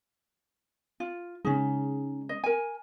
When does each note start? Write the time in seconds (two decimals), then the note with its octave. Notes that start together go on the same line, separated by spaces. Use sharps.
1.00 F4
1.45 C#3 G#3 C#4 D#4
2.29 D#5
2.44 A#4 G#5